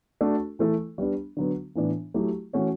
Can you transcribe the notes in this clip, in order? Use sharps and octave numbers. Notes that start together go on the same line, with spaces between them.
A3 D4 F#4 A4
E3 A3 E4 A4
G3 B3 D4
D3 F#3 B3
A2 E3 B3 D4
F#3 A3 E4 G4
E3 A3 C#4 F#4 C#5